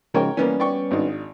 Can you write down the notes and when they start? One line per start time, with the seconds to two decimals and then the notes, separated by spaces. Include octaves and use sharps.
0.14 G#2 C#3 F3 A#4 C#5 G5
0.37 E3 G3 A#3 B3 C#4
0.60 D5 G5 C#6
0.91 G#1 D4 D#4